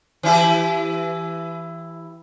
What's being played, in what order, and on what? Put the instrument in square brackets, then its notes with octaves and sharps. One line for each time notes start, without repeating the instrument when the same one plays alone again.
[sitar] E3 E4 G4